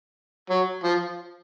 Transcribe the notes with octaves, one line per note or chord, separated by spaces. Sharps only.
F#3
F3